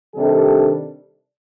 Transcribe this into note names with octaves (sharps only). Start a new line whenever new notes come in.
C3 D#3 G3 D4 A4